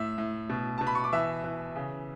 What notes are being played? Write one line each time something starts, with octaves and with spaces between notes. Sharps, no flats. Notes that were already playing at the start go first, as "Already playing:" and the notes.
Already playing: A2 E5 E6
A2
B2
B2 A5
B5
C#6
D6
E3 E5 E6
E3
C#3